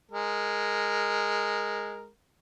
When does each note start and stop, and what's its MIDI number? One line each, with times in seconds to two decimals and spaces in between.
0.12 2.08 56
0.12 2.08 70